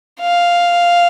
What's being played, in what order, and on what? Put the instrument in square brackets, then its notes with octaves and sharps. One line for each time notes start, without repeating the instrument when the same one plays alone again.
[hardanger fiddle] F5